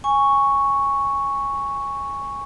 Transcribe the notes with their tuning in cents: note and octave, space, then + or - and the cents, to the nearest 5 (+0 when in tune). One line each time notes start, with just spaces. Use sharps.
G#5 -15 C#6 +0